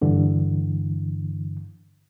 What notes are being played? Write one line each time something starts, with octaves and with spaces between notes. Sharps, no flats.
G2 D3 E3